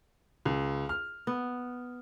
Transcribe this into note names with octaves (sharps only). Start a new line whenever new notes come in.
C#2
F6
B3